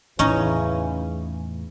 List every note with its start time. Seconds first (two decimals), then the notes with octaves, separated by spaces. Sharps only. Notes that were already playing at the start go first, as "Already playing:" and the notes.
0.19 E2 A2 C#3 E3 C#4 D#4 D#5